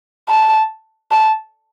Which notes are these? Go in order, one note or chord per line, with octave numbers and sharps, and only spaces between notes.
A5
A5